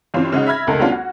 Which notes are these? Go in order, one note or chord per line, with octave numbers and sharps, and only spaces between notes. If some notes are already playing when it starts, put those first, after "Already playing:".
G2 E3 C4 C#4 F4
C#3 G#3 D#4 F#4
E5 B5 F6 G#6 A#6
F1 C#2 A3 D#4 A#4
G3 B3 C#4 D4 F4 F#4
F#4